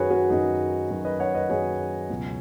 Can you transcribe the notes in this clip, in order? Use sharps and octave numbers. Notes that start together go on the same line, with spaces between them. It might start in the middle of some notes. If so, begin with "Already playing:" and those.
Already playing: F#2 D#3 F#3 F#4 G#4 B4 C#5
F#4 B4
F#2 D#3 F#3 D#4 G#4
F#2 D#3 F#3
B4 D#5
C#5 F#5
B4 D#5
F#2 D#3 F#3 G#4 C#5
C#2 B2 F#3